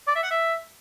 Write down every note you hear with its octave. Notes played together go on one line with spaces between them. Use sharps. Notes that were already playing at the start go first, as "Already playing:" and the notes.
D5
E5
F#5
E5